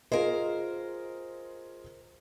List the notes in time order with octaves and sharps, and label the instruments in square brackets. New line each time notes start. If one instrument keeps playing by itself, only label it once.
[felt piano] F4 G#4 D#5 [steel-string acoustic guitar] A#4 C5